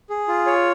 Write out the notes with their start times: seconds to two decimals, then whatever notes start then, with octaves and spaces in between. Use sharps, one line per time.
0.10 G#4
0.28 F4
0.46 C#5